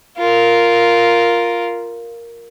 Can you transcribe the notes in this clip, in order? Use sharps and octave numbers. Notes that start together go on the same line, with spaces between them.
F4 A#4